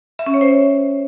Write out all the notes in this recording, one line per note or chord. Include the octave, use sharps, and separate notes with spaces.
E5
C#4
C#5
C5